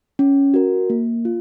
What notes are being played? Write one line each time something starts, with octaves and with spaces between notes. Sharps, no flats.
C#4
F#4 A#4
A#3
F4